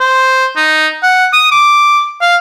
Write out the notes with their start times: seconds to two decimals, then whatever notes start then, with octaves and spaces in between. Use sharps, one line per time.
0.01 C5
0.56 D#4
1.03 F#5
1.33 D#6
1.52 D6
2.21 F5